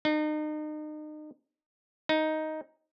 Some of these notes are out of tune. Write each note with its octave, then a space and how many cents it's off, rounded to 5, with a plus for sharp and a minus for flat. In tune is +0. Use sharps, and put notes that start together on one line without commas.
D#4 -35
D#4 +5